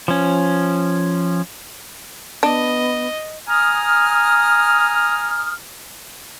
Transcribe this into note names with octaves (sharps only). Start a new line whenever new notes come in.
F3 C#4
B3 D4 D#5
G#5 A#5 D#6 F6